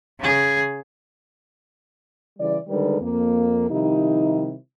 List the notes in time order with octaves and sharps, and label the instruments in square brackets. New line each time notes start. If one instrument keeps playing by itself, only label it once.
[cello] C#3 G#4
[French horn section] C#3 E3 G3 D5
D3 D#3 G3 G#3 A#4 B4
F2 A#3
C3 D#3 F3 G3 D#4 E4